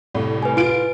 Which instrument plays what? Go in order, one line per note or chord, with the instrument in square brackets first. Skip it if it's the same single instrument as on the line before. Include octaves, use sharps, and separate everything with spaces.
[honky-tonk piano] C2 A2
[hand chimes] B4 G#5
[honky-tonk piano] F4 D7